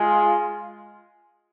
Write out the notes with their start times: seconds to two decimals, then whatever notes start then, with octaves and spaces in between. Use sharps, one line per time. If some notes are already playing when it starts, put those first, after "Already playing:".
Already playing: G#3 F4 G#4